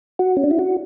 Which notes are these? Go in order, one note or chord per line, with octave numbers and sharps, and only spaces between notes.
F#4
C#4
D4
E4
F#4